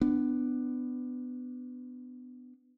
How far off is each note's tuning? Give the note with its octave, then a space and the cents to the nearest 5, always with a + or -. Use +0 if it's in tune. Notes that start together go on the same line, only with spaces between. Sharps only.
B3 +20 D4 +15